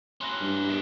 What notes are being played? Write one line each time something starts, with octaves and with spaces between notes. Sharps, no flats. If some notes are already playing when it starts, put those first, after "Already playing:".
C#4 E4 C6 F#6 A#6
G2
B2 D#3